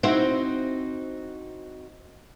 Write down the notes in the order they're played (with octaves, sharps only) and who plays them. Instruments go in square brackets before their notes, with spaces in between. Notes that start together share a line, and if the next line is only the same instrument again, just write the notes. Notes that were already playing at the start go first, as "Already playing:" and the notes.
[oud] C4 E4 C5 [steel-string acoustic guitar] D#4 F#4